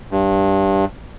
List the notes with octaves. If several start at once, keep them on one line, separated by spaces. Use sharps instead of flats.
G2